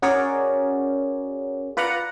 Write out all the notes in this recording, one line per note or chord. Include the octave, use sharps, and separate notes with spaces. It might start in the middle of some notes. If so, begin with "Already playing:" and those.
C#4 F#4 G#4 A#4 C#5 D5
F4 B4 D5 F#5 A#5